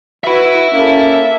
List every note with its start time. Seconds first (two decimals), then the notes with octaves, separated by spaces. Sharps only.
0.24 F#4 B4 E5 B5
0.73 A#3 C#4 A4